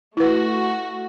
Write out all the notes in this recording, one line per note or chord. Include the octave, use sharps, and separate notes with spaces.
A3 E4 F#4 B4